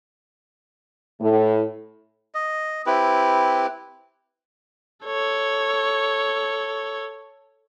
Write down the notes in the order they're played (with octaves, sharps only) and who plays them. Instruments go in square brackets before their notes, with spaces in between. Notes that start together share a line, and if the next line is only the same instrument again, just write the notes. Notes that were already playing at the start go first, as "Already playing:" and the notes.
[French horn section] A2
[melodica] D#5
C4 E4 G4 B4
[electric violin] A4 C#5